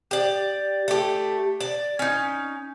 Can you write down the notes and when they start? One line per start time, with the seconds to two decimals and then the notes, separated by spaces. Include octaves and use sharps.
0.11 G4 D5
0.88 A3 G4
1.60 D5
1.99 C#4 D#4